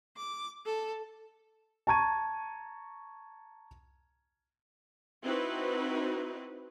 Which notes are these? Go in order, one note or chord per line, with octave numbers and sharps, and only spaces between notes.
D6
A4
A5 A#5 C#6 G#6 D#7
C4 D#4 E4 F#4 B4